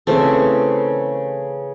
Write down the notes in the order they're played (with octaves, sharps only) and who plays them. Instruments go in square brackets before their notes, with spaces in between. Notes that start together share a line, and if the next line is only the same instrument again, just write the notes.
[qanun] C#3 E3 A3 C4